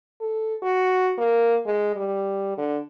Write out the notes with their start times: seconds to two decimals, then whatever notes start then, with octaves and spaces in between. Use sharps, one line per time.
0.21 A4
0.62 F#4
1.18 A#3
1.66 G#3
1.96 G3
2.58 D3